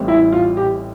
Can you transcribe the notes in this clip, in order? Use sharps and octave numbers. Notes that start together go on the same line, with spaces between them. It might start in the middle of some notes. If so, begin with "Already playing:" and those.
Already playing: A1 A2 E3 G3 C4
E4
F4
G4